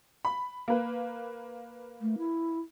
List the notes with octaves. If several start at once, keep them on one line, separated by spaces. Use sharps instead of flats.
B5
A#3 B4
A3
E4